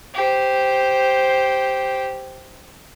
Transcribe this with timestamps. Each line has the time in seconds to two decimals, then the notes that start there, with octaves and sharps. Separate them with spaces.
0.14 G4 C5